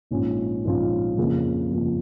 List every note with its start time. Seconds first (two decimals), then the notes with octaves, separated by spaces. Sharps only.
0.11 A#1 G#2 F3 C#4 F4
0.64 A#1 G#2 F3 C#4 F4
1.18 F2 C#3 F3 A#3
1.71 F2 C#3 F3 A#3